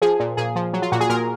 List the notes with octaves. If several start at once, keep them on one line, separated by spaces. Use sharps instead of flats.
F3 G#4
A#2
A#2 G#4
F3
F#3
F4
A#2 F#4
G#4
A#2 A#4